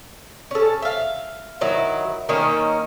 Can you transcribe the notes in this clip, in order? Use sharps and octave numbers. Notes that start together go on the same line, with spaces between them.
C#4 A4
E5 F5
D#3 F#3 E4
D#3 A#3 C#4